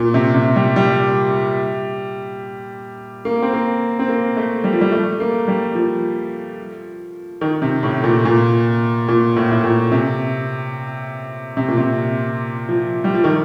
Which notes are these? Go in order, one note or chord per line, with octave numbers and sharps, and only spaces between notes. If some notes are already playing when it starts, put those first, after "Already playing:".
Already playing: A#2
C3
C3
G3
G3
A#3
C4
A#3
C4
A#3
A3
G3
F3
G3
A3
A#3
G3
F3
D#3
C3
A2
A#2
A#2
A#2
A2
A2
A#2
C3
C3
A#2
C3
F3
G3
F3
D#3